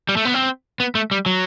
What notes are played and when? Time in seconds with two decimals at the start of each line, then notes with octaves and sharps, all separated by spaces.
0.09 G3
0.17 A3
0.25 B3
0.34 C4
0.80 B3
0.95 A3
1.11 G3
1.26 F#3